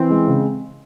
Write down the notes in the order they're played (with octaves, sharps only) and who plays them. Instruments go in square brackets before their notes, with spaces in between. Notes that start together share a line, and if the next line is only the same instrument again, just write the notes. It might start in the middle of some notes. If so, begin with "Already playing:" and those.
Already playing: [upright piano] E3 [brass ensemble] C4
[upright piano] G#3
C#3